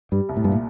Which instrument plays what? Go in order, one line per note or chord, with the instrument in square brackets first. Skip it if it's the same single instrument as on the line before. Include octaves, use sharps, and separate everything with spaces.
[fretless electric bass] G2 [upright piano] G3
[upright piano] C2
[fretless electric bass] A2
[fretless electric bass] G2 [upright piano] A#2
[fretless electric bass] A2